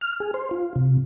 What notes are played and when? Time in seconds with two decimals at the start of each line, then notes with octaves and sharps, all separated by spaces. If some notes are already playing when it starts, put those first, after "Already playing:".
0.01 F6
0.20 G#4
0.34 C5
0.51 F4
0.76 C3